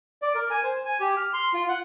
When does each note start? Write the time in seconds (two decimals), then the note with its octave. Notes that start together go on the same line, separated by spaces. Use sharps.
0.22 D5
0.35 A#4
0.51 G#5
0.63 C5
0.85 G#5
1.00 G4
1.17 F6
1.33 C6
1.54 F4
1.69 F#5